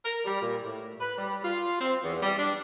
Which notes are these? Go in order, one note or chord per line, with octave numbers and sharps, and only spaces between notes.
A#4
G3
A#2
A2
B4
G3
F4
C4
E2
G3
D4